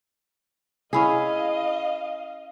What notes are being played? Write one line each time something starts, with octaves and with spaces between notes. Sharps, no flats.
C#4 E4 G#4 D#5 F5